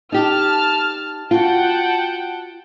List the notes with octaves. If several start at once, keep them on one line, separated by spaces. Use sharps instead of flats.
D#4 G4 A5 F6
F4 F#4 F#5 G5 A5